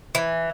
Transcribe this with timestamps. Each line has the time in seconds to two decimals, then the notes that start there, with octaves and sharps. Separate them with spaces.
0.15 E3